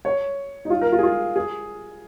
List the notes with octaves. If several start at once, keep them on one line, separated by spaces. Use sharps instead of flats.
C#5
D#4
F4
A#4
F4
G#4
F4
G#4